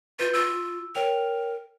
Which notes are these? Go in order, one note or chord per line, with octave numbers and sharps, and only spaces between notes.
F4 B4 G6
F4 E6
A#4 C#5 G5 F7